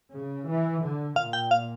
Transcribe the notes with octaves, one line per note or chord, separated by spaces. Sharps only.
C#3
E3
D3
A#2 F5
G5
F5